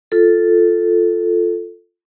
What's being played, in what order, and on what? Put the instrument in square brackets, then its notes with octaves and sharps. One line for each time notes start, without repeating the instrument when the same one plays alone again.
[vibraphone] F4 A4